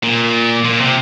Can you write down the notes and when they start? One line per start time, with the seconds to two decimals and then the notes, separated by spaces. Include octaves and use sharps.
0.03 A#2
0.65 A#2
0.80 C3